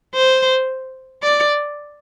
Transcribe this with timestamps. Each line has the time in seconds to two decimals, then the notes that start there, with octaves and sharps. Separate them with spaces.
0.14 C5
1.23 D5